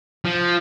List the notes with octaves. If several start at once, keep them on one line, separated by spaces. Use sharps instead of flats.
F3